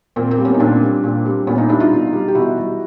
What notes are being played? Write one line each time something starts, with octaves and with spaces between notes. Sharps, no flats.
A#2 A#3 C4
A#3 C4
G3
B3 C#4
D#4
A#2 C4 D4
G3
A#2
G3
A#2 B3 C#4
C#4 D#4
G3 D4 E4
D#4 F4
B2
G3
G4
B2 E4 F#4
G3